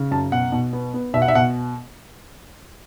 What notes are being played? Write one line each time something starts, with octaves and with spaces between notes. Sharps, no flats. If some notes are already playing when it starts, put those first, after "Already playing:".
Already playing: C#3
F#2 A5
B2 F#5
B2
B3
B3
B2 E5
F#5
E5
B2 F#5